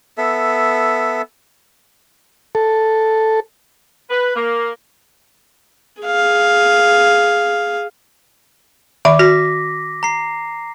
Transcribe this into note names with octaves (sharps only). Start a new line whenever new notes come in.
B3 A4 E5
A4
B4
A#3
G#4 F5
D#3 E5 B5 D6
F#4 A#6 B6
A#5 C7